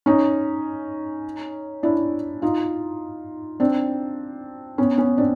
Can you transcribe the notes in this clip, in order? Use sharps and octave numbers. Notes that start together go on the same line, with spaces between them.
C#4 D#4
D4 E4
D#4 F4
C4 D4
B3 C#4
B3 C#4
C4 D4